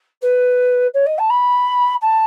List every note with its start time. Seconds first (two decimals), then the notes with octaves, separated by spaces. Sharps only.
0.21 B4
0.94 C#5
1.06 D#5
1.18 A5
1.30 B5
2.01 A5